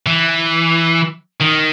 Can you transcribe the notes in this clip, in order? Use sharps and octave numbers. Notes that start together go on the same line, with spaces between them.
E3
D#3